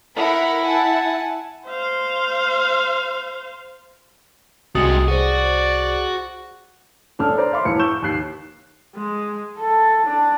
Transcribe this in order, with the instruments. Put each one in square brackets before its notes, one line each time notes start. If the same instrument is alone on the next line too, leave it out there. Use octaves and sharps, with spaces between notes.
[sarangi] E4 [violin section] A#4 F#5 B5
[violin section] F#5 G#5 A5
[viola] C5 F5
[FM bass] C2 [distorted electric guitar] C3 G#3 [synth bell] F#4 D#6 A6
[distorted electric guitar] F#4 [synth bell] G#4 C5 [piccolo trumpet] D5
[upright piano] E1 D4 A4 F6
C5 D5 A#5
E5 F5 B5 C6 D6
E1 E3 C#7
C#6 E6 G6 E7 G7
D#2 D#3 F#6 C7
[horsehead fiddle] G#3
A4
D4